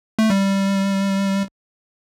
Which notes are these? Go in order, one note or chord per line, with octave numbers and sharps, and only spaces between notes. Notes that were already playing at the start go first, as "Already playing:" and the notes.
A3
G3